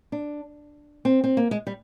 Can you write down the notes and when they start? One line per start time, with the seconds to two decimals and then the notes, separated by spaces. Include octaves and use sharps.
0.12 D4
1.05 C4
1.24 C4
1.37 A#3
1.51 G#3
1.67 G3